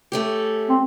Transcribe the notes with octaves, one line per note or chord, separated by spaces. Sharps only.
A3 C#4 G4
C4